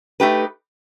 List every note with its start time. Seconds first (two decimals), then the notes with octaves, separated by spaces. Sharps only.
0.20 A3 D#4 G4 B4